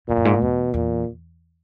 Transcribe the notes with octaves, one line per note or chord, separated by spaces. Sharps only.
F2 A#2
F#2
G#2
A2
E2 B2
E2 A#2